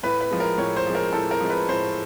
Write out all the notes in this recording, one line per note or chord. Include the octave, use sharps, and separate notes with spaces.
A2 B4
B4
F3 G#3
A#4
A2 C#5
C5
F3 G#3
A#4
A2 A4
A#4
F3 G#3
B4
A2 C5